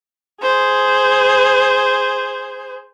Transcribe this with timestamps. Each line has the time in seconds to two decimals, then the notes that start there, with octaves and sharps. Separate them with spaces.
0.42 G#4 C5